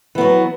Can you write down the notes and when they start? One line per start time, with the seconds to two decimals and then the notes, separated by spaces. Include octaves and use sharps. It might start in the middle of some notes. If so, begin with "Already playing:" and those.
0.15 E3
0.18 B3
0.21 F#3